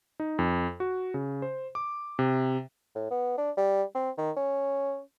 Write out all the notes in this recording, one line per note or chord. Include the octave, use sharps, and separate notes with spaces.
D#4
F2
F#4
C#3
C5
D6
C3
A2
B3
D4
G3
C4
D#3
C#4